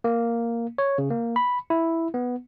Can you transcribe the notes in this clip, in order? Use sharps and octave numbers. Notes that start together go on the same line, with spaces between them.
A#3
C#5
C#3
A#3
B5
E4
B3